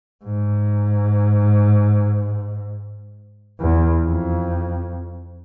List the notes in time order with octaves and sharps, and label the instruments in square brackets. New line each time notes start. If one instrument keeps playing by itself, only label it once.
[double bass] G#2
E2
F2